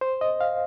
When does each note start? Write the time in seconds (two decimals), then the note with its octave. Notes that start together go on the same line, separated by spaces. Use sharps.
0.01 C5
0.21 D#5
0.41 F5